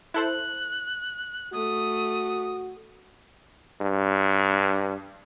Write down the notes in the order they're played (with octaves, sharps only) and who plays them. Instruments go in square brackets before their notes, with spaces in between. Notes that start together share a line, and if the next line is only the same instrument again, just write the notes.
[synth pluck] E4 A4 C5 [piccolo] F#6
[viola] A3 [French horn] F#4 [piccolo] D#6
[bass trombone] G2